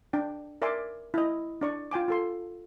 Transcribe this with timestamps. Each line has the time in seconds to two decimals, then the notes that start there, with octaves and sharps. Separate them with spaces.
0.13 D4 G5
0.62 A#4 D5 E5 G#5 C6 D6
1.14 E4 D#5
1.61 D4 D5 C#6
1.91 F4 G5 G#5 D6
2.08 F4 A4 C6